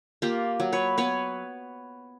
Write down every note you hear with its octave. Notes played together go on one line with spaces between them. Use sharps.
A#3 F4 G4
F#3
B4 C#5
B3 B4 C#5